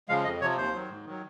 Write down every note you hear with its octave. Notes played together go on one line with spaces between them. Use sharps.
C#3 F3 G#3 F5
F2 D#5
C3 F3 C#5
D#2 C5
D#3 F#3
G#2
D#3 F#3